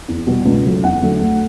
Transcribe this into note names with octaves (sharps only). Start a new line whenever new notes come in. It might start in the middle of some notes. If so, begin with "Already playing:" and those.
E2
B2 G3
C#2
C#3 F#3 A3
E2 F#5
D3 F#3 A3
D2